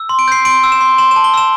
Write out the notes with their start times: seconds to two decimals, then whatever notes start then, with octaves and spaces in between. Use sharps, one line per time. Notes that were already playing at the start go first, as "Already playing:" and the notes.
Already playing: E6
0.09 C6
0.19 D7
0.28 G6 C7
0.45 C6 D7
0.63 E6
0.72 E7
0.81 C6
0.98 C6 E7
1.11 E7
1.16 A5
1.24 G7
1.34 E6 E7